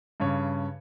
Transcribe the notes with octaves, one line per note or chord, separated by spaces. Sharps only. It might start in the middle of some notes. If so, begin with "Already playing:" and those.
G2 C#3 C#5